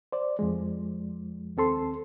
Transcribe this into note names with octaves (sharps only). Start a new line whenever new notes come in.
C5 D5
F2 F3 G#3
D#2 C4 A4 C6